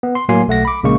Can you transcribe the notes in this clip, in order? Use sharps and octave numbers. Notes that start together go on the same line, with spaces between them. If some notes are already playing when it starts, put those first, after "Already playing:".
B3
C6
A2 F#3 A#3 G#5 C6 C7
B1 A3 F#5 A#6
B5 D6
A#1 C#3 G#3 A#3 C#6